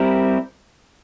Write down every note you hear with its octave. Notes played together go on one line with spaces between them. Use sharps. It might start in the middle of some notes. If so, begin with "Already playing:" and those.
Already playing: G3 C4 E4 G4 A#4